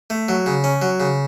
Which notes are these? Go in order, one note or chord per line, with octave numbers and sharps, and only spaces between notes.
A3
F#3
C#3
C#4
F#3
C#3